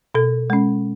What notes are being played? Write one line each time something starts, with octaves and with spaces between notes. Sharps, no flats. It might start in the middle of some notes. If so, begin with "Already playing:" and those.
B2 A4
G#3 C#4